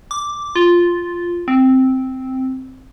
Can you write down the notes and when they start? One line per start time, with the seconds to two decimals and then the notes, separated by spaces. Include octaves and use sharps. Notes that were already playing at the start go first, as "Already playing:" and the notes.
0.11 D6
0.56 F4
1.48 C4